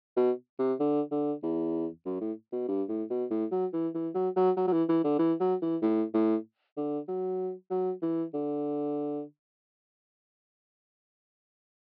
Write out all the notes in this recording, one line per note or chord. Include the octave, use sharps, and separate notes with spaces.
B2
C3
D3
D3
E2
F#2
A2
B2
G2
A2
B2
A2
F#3
E3
E3
F#3
F#3
F#3
F#3
E3
E3
D3
E3
F#3
E3
A2
A2
D3
F#3
F#3
E3
D3